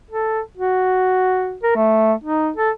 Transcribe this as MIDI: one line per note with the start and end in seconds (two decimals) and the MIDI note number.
0.11 0.40 69
0.58 1.57 66
1.63 1.73 70
1.76 2.13 57
2.24 2.49 63
2.57 2.70 69